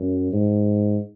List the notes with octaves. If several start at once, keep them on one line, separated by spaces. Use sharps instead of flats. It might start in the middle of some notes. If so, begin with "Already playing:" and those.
Already playing: F#2
G#2